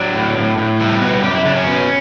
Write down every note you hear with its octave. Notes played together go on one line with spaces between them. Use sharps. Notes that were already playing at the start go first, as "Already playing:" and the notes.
Already playing: F#3 D4
A2
A2
A2
G3 E4
B2 F#4
F#2 G4
E4
C#3 D4
C#4
B2